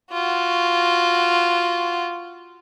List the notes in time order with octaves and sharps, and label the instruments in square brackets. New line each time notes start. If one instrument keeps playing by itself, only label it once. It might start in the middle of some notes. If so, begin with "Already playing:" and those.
[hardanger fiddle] F4 F#4